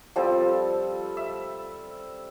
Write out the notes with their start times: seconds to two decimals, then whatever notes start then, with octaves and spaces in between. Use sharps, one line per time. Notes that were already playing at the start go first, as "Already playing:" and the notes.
0.16 F3 G3 C4 A4
1.17 E5